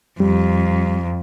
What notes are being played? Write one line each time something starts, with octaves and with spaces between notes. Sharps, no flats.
F2 G3